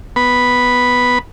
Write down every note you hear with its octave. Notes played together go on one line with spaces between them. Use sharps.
B3 B5